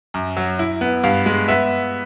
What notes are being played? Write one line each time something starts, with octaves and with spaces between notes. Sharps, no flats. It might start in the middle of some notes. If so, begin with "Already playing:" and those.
F#2
F#3
E4
B3
G2 F5
G#3
B3 E5